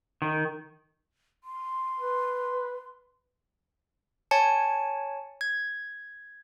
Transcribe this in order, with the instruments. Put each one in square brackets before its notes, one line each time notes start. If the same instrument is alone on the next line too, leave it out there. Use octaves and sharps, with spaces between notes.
[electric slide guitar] D#3
[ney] C6
[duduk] B4
[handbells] C#5 G#5 A5 C#7
G#6